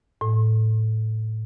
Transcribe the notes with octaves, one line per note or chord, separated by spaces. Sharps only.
A2